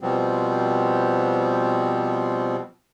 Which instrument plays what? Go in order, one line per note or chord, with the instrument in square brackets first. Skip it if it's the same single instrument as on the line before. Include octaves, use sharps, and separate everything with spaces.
[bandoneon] B2 F3 G3 B3 C4